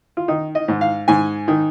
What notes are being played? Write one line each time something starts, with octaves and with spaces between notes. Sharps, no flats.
F4
D#3 D#4
D#5
G#2
F5
G#2 G#5
D#3